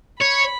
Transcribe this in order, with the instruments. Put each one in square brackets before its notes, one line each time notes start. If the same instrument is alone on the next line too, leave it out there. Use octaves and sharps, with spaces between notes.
[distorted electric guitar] C#5 [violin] B5